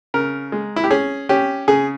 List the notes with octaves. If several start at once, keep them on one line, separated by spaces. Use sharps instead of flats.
C#3 A#4
G#3
E4
G4
C#4 G#4
C#4 G4
C#3 G#4